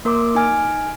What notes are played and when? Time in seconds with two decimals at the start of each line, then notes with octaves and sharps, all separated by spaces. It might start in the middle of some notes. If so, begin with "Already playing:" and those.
0.05 A#3 A#4 C6 D6
0.35 D#4 G#5 F6